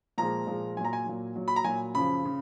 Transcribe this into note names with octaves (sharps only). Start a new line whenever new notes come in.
A#2 F3 G#3 A#5
A#2 F3 G#3
A#2 F#3 G#5 A#5
G#5
A#2 F#3
A#2 F#3
B5
A#5
A#2 F#3 G#5
F#2 C#3 F3 B5
C#3